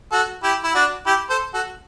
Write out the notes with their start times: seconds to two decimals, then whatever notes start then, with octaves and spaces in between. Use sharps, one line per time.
0.12 F#4 A4
0.43 E4 G4
0.64 E4
0.74 D4 F#4
1.06 E4 G4
1.30 A4 C5
1.54 F#4 A4